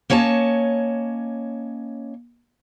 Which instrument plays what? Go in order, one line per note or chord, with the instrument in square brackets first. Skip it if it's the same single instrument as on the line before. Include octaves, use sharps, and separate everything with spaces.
[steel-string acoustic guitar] A#3 C#4 C#5 D#5 A5